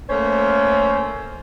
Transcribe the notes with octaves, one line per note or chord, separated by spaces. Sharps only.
A3 A#3 C#4 C5 C#5